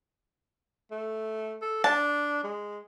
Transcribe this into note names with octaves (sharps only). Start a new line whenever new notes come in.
A3
A4
D4 A5
G#3